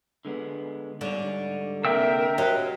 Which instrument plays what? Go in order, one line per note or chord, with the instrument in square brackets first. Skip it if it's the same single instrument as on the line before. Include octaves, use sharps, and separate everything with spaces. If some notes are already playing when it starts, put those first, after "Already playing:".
[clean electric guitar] D3 G#3 B3
[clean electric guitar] G#2 G3 C#5 [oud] D3
[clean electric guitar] C3 A#3 C4 [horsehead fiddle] A#4 [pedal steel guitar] E5 G5 E6
[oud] F#3 [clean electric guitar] G4 C5 D#5